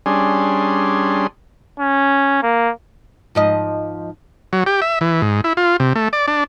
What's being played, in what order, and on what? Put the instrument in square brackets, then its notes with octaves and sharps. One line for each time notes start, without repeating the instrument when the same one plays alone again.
[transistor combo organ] G3 C#4 D4 G#4 C6
[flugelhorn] C#4
A#3
[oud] G#2 F3 D#5
[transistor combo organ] F#3
G4
E5
E3
G#2
E4
F4
C3
A3
D5
D4